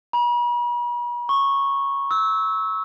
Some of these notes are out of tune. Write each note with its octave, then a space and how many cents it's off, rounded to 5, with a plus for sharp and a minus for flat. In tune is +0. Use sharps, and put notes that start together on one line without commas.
B5 -45
C#6 -10
E6 -20